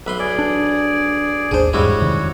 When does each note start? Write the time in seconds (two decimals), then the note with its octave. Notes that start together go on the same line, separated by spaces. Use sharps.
0.06 B1 B4 E5 B5 C6
0.19 G#4 D5
0.39 D4
1.51 G#1 D#2 D4 G#4 C5
1.73 E2 G#2 G3 G#3 E4 F#4 C#5
2.02 F#2 C3 D#3